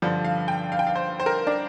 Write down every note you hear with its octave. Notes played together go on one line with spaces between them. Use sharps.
G2 D3 F3
F5
G5
F5
G5
F5
C5
C5
A#4
D4